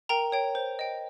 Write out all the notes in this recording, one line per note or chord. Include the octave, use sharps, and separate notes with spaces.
A#4 G5 A#5
C#5 G5
C5
D#5 G5